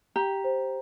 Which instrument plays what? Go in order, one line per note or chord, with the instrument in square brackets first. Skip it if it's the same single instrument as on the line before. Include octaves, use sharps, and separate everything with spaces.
[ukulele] G4 [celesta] A#5
[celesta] C5